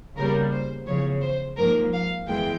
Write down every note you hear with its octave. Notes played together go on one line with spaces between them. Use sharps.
E2 C#3 G3 A#3 A#4
C5
E2 C#3 F3 C#5
C5
G#2 F3 A#3 A#4
F5
E2 E3 G#3 G5